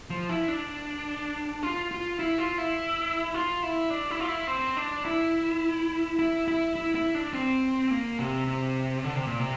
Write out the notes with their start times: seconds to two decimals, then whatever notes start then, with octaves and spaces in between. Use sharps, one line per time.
0.10 F3
0.29 E4
0.48 D4
1.63 F4
1.91 F4
2.19 E4
2.38 F4
2.58 E4
3.34 F4
3.63 E4
3.90 D4
4.10 E4
4.20 F4
4.28 E4
4.47 C4
4.77 D4
5.05 E4
6.19 E4
6.48 E4
6.76 E4
6.95 E4
7.15 D4
7.34 C4
7.91 A#3
8.19 C3
8.47 C3
9.04 D3
9.15 C3
9.27 A#2
9.40 C3